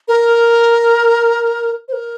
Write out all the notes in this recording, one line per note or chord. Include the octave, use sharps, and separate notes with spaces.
A#4
C5
A#4